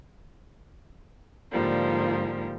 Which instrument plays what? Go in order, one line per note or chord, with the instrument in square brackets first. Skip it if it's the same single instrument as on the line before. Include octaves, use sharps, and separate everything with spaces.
[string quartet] G#2 D3 F3 G3 A#3